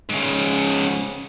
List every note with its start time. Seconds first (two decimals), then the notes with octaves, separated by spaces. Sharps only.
0.10 G#2 C#3